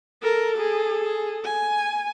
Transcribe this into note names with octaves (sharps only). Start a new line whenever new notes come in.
A4 A#4
G#4
G#4
G#5